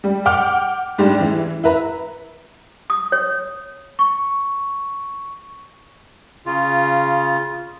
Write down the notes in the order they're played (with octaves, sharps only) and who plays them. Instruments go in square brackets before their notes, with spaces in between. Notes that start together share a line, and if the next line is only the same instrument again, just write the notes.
[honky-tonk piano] G3
F#5 G5 D6 F6
G#2 G3 D4
E3
E4 B4 A#5
[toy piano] D#6
C#5
[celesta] C#6
[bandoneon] C#3 F4